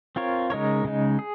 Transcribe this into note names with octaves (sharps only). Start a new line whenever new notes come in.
C4 F4 A#4 C#5
C#3 G#3 D#4 A#4 C#5
C#3 G#3 D#4
G#4